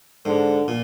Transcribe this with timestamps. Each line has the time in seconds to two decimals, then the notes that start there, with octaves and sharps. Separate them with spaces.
0.25 G#2 D3
0.68 A#2